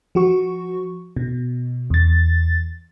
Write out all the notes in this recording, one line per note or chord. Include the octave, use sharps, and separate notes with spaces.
F3 F#4 C#6
B2
E2 A6